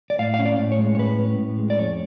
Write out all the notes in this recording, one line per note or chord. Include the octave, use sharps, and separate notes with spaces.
D5
A2 F5
F5
C#4
D5
A2
C#5
G#3
C#5
A2 B4
C#4
A2
G#3
D5
F2 C#5